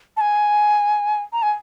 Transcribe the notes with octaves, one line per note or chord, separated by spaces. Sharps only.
A5
G#5
A#5
G#5